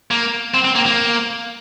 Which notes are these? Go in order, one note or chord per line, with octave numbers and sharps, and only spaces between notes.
A#3
C4
C4
A#3
A#3